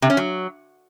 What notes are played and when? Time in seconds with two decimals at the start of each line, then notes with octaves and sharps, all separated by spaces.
0.02 C3
0.10 C#4
0.17 F#3